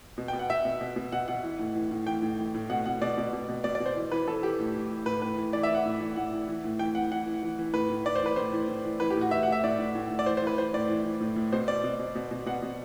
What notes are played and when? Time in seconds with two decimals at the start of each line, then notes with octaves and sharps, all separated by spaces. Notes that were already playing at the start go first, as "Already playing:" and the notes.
0.18 B2
0.28 G5
0.33 B2
0.39 F#5
0.50 B2 E5
0.65 B2
0.81 B2
0.96 B2
1.12 B2 F#5
1.28 B2 F#5
1.43 E3
1.59 A2
1.75 E3
1.91 A2
2.07 E3 G5
2.22 A2
2.39 E3
2.54 A2
2.70 B2 F#5
2.86 B2 F#5
3.02 B2 D5
3.18 B2
3.33 B2
3.49 B2
3.64 B2 D5
3.75 D5
3.80 B2
3.86 C5
3.96 E3
4.11 E3 B4
4.27 E3 A4
4.43 E3 G4
4.60 A2
4.74 E3
4.90 E3
5.06 A2 B4
5.22 A2 B4
5.37 E3
5.53 E3 D5
5.63 E5
5.70 E3 F#5
5.85 A2
6.00 E3
6.16 A2 F#5
6.33 E3
6.48 E3
6.64 A2
6.79 E3 G5
6.95 E3 F#5
7.12 E3 F#5
7.26 E3
7.43 E3
7.59 E3
7.73 A2 B4
7.90 A2
8.06 A2 D5
8.16 C5
8.22 E3 B4
8.36 A2 C5
8.53 E3
8.68 A2
8.85 E3
9.00 E3 B4
9.10 G4
9.16 A2
9.21 F#4
9.31 E3 E5
9.43 F#5
9.48 A2 E5
9.64 A2 D5
9.79 A2
9.95 A2
10.10 A2
10.19 D5
10.26 E3 C5
10.37 C5
10.42 E3 B4
10.58 E3 C5
10.73 A2 D5
10.89 E3
11.05 E3
11.20 A2
11.36 A2
11.52 B2 C5
11.68 B2 D5
11.84 B2
11.99 B2
12.15 B2
12.31 B2
12.46 B2 F#5
12.62 B2